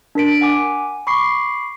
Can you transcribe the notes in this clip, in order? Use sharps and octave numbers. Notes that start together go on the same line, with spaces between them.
D4 A#4 B6 D7
F#5 G#5 D6
B5 C#6 D6 C7